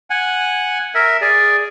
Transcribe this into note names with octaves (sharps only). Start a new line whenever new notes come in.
F#5 G#5
A#4 E5
G#4 D5